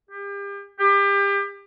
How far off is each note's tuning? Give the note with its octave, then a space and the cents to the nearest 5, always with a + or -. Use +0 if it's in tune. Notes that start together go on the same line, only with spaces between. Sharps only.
G4 +35
G4 +30